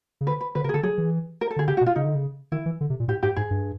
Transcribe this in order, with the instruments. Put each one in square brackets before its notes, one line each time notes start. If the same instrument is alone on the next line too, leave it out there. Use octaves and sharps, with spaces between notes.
[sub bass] C#3
[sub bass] D3 [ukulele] B4
[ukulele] B4
[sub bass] D3 [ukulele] B4
[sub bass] C#3 [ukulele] A#4
[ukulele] G#4
[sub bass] D3 [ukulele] A4
[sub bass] F#3 [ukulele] G#4
[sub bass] E3
[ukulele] A#4
A4
[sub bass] D3 [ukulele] G#4
[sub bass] C#3 [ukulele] G4
[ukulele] F#4
[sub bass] B2
[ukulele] F4
[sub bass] C#3 [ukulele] D#4
[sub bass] D3
C#3
[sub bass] D#3 [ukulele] E4
[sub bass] E3
D3
C3
A#2
[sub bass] A2 [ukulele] G4
[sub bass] G#2 [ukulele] G4
[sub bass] G#2 [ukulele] G#4
[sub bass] G2